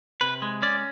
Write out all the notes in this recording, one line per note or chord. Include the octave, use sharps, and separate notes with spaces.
C3 B4
G#3
C#4 D5